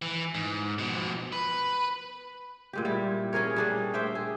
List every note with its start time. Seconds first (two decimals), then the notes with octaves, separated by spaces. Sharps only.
0.02 E3
0.35 G#2
0.79 B2 F3
1.32 B4
2.73 A#2 G#3 G4
2.85 G3 E4
3.33 C#4 G#4 A#4 C#5
3.56 G3 D4 G#4
3.94 G4 C5 E5 G5
4.15 G#4